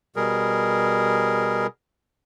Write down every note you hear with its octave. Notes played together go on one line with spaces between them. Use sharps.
B2 G3 G#4 A#4